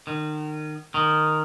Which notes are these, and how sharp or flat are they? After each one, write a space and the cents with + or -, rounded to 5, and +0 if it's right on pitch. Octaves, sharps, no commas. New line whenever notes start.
D#3 -30
D#3 -10